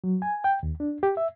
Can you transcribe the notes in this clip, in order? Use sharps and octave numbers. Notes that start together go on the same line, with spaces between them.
F#3
G#5
G5
D#2
D4
G4
E5